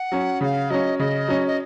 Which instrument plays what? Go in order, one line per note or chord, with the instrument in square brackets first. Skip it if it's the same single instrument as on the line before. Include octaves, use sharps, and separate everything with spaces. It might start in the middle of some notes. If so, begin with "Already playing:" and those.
Already playing: [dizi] F#5
[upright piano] F#3 C#4
[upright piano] C#3 [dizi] F#5
[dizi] F5
[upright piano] F#3 C#4 [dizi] D#5
[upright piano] C#3 [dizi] D#5
[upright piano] F#3 C#4
[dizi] D#5